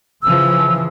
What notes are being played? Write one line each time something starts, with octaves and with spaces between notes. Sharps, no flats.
C#3 E3 F3 E6